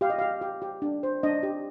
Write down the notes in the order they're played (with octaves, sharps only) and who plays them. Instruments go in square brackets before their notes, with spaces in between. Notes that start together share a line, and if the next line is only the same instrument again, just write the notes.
[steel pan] G4 F5
D#5
G4 F5
G4
G4
D4
C5
D4 D#5
G4